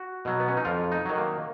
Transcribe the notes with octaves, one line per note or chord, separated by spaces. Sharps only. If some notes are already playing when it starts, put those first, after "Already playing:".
Already playing: F#4
B2 F#3
B3
C#4
D#4
F2 F4
D#4
D#3 F#3
A#3